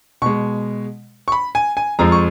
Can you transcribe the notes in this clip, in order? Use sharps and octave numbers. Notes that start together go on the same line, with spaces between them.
B2 G#3 C#6
C#6
B5
G#5
G#5
F2 F3 G#3 A#5
C#6